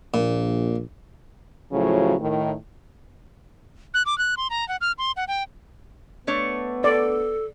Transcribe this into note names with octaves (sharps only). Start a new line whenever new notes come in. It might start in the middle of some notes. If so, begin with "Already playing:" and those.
A#1 A#2
A2 C#3 F3 F#3
A2 D#3
F#6
D6
F#6
C6
A#5
F#5
F6
C6
F#5
G5
A3 B3 D4 C#5
A4 D5